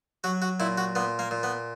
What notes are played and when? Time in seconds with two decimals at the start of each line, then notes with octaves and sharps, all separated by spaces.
0.24 F#3 F#4
0.42 F#4
0.60 A#2 E4
0.78 F#4
0.95 A#2 B3
1.19 A#3
1.31 A#2
1.43 B3